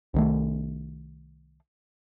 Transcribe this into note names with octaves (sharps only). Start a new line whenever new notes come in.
C2 D#3 A3